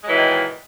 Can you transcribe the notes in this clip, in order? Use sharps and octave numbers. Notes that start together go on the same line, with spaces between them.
A#2 D#3 E3 F#3 G#3